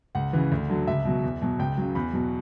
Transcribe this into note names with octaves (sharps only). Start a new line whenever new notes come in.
C#2 F#5
C#3 E3
D2
D3 F#3
C#2 E5
B2 F#3
E2
B2 F#3
C#2 G5
C#3 F#3
E2 B5
B2 F#3